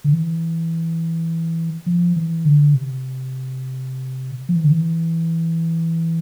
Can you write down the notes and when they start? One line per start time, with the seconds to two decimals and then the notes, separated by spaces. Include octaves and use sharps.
0.04 D3
0.13 E3
1.86 F3
2.16 E3
2.45 D3
2.74 C3
4.49 F3
4.55 E3
4.64 D3
4.71 E3